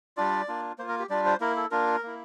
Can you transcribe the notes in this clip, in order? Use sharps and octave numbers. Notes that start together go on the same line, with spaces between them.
G3 D4 F4 D5
A#3 D4 F4
A#3 F4 C5
A#4
G4
G3 D4 F4 D5
C5
A#3 E4 A#4
A4
A#3 D4 F4 A#4
A#3 E4